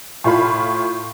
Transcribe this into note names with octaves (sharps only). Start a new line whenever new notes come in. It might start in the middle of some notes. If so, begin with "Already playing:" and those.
A2 F4 B5